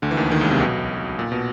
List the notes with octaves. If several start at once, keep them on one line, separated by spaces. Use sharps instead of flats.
D2 D3
E3
D#2 D#3
D#2 D#3
C#2 C#3
C2 C3
B1 B2
A#2
B2